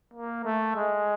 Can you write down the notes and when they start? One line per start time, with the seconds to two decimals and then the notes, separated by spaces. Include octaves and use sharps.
0.14 A#3
0.45 A3
0.76 G#3